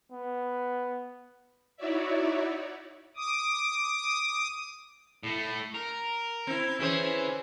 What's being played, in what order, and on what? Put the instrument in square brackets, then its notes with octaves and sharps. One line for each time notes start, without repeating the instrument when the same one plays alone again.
[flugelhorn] B3
[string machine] D#4 E4 F#4 C#5 D5 E5
[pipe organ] D6 D#6
[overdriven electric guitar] A2 A3
A#4
[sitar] C4 E4
[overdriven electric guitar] E3 [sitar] C#4 G#4 C5